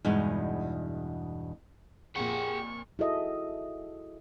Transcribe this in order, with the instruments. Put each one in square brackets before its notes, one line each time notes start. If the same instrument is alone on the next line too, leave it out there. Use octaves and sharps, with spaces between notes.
[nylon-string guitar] E2 G2 B2 G#3 D#4
[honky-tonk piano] F2 A#2 [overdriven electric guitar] G4 F#5 [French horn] G#4 [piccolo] C#6
[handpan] E4 F#4 G#4 A4 D#5 E5